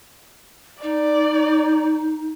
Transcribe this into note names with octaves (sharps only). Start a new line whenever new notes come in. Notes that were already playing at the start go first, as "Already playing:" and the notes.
D#4 D5